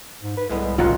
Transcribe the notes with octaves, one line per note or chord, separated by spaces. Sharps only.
G#2
B4
C2 A2 G#3 B3
D1 A1 G2 C#4 D#4 F4 F5 F#5